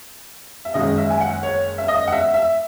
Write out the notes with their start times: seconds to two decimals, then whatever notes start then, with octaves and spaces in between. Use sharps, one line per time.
0.65 E5
0.74 F#1 F#2 D#3 G#3 D#5
0.98 E5
1.10 G#5
1.21 F#5
1.43 C#5
1.78 E5
1.88 D#5
2.07 F#5
2.12 E5
2.34 E5